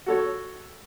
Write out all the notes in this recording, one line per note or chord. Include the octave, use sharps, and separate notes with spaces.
F#4 A4 C#5